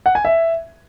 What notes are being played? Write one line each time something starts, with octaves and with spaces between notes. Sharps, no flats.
F#5
G#5
E5